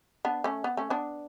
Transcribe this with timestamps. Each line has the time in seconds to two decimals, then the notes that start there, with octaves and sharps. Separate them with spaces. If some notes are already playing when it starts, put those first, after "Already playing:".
0.25 B3 D4
0.44 A3 C#4
0.64 B3
0.77 A3 C#4
0.90 B3 D4